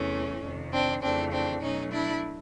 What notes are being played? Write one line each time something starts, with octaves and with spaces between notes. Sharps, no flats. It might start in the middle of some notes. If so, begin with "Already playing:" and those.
Already playing: E2 C3 E3 A3 C#4
F2 C3 D#3
C4 D4
F2 C#3 E3 A3 C4 D4
C4 D4
B2 F#3 A3 C#4 D#4
D4 E4